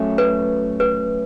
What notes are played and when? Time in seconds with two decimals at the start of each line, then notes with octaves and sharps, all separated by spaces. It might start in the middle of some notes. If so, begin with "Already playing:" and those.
Already playing: F#3 A3 C#4
0.18 B4
0.80 B4